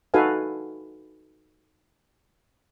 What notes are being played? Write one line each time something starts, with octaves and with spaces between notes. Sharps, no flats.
D#4 F#4 A4 B4 F5 G#5